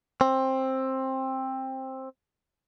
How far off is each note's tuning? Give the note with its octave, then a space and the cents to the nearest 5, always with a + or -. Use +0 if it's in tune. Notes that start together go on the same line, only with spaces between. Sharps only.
C4 +15